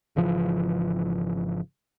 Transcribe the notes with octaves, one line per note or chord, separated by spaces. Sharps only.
G#1 C#3 E3 F3